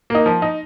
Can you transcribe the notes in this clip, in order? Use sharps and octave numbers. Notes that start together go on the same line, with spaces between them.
A#3 D#4
F3
D#4